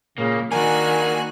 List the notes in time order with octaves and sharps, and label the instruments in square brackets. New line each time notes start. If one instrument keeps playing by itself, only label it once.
[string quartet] A#2 [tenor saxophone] C#3 [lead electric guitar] A#3
[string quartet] D#3 F#4 F#6 [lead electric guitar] A#3 D4 [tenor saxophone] A#4 [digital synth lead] G#5